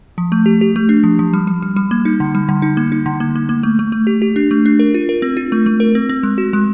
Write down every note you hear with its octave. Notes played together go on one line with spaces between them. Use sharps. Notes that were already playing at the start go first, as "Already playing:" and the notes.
F3
A3
G4
G4
A3
D4
F3
F3
G3
G3
G3
G3
A#3
D#4
D3
G3
D3
D#4
A#3
D#4
D3
A#3
A#3
A#3
A3
A3
A3
G4
G4
D4
A3
D4
A#4
F4
A#4
C4
F4
A3
A3
A#4
C4
C4
G#3
F#4
G#3